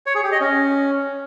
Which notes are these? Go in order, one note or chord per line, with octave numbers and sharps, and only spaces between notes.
C#5
G#4
G4
D#5
C#4